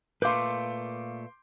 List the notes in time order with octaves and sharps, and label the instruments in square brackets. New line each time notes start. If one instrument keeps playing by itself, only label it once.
[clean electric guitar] A#2 A3 [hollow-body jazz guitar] B4 F5 [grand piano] C6 D6 G6